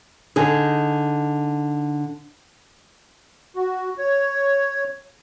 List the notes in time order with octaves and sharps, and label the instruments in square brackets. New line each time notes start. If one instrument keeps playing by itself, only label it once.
[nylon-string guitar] D3 D#4 G#4
[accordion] F#4
C#5